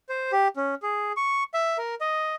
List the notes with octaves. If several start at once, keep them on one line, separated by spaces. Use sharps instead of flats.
C5
G4
C#4
G#4
C#6
E5
A#4
D#5